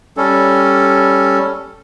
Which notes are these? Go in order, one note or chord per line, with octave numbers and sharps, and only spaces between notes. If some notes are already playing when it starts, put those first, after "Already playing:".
G3 C#4 A4